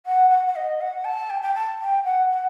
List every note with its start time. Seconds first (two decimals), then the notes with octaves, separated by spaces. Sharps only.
0.06 F#5
0.30 F#5
0.46 F#5
0.56 D#5
0.81 F#5
1.05 A5
1.30 G5
1.42 G5
1.55 A5
1.81 G5
2.04 F#5
2.30 F#5